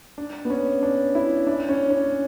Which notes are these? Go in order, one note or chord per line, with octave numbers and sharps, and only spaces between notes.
D4
B3
C#4
D4
E4
D4
C#4
C#4